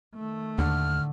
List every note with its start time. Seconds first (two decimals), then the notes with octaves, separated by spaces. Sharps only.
0.15 D#3 A3
0.58 D#2 A2 D3 F6